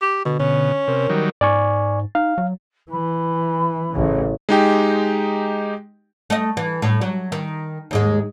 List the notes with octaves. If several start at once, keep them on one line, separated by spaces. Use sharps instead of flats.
G4
B2 D3
B2 C#4
C3 A#4
D#3 F#3 G3
G#2 D5 G#5 C#6
D#4 F5
F#3
E3 B5
A1 C#3
G#3 D#4 G4 G5
A3 D#5
E3
A2
F#3
D#3
D#2 G#2 G#3